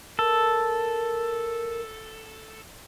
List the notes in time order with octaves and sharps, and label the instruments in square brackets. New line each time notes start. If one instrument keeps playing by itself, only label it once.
[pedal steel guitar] A4 [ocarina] A#4